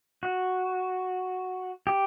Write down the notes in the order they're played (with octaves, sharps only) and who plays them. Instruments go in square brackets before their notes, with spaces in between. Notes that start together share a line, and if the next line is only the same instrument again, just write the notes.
[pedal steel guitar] F#4
G4